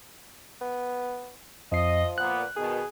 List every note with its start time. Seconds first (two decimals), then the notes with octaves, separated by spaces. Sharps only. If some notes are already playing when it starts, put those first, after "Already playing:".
0.61 B3
1.72 F2 F3 D#5 C7
2.18 A#2 B3 F#6
2.56 B2 D#3 G#4